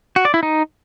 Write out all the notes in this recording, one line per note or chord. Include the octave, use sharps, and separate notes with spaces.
F#4
D5
E4
D#4